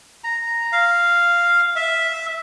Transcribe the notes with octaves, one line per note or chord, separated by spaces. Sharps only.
A#5
F5
E5